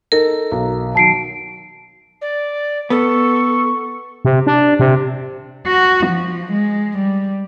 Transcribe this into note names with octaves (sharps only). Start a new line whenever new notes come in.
D#4 A4 A#4
B1 A#5
D#3 F#3 A5 C7 D7
D5
B3 A4 C#6
C3
D4
C3
F#4
F3
G#3
G3